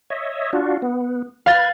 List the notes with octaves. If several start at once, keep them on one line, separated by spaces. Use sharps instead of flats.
C#5 D#5 E5
D4 F4 F#4
B3
B4 F5 B5 G#6 A6